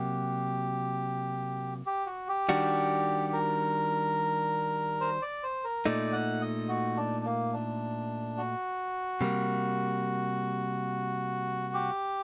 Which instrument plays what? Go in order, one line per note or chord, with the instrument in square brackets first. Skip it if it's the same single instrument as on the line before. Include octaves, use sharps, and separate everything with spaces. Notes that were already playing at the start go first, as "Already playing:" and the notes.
Already playing: [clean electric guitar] C3 F#3 A#3 F#4 [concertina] G4
[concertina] G4
F#4
G4
[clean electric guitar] D#3 G3 D4 F#4
[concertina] A#4
C5
D5
C5
A#4
[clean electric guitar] A#2 A3 D#4 [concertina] D5
[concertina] F#5
D#5
F#4
D4
A#3
D4
F#4
[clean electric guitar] C3 G3 A#3
[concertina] G4